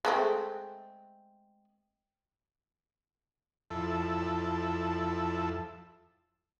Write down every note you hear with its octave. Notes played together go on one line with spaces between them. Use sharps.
G#3 A3 C4
F2 E4 A4